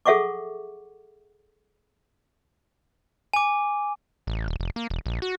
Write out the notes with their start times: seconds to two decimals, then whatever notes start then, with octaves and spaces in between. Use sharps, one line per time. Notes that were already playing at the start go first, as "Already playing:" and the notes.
0.06 G#4 A4 E5 F#5 C#6 D6
3.33 G#5 D6
4.27 A1
4.48 D#1
4.60 F1
4.76 A#3
4.90 E1
5.06 A#1
5.22 F#4